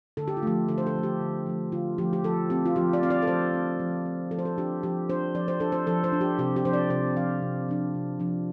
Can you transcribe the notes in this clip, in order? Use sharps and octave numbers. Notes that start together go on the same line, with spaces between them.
D3 A4
G4
F4
F3 A3 G4
D3 A4
C5
A4
F3 A3
G4
D3
F3 A3
D3 F4
F3 A3 G4
G4
F3 A4
C4 G4
F4
F3 G4
D5
C4 F5
D5
A4
F3 C5
C4
F3
C4
F3 A4
C5
A4
D4 G4
F3 G4
D4 C5
F3 D5
C5
D4 A4
C5
F3 A4
C5
D4
G4
C3 G4
G4
F3 D4 C5
D5
C3 C5
F3 D4 F5
C3
F3 D4
C3
F3 D4